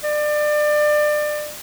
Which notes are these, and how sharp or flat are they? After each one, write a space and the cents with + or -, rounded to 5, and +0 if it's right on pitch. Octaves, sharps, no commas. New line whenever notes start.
D5 +30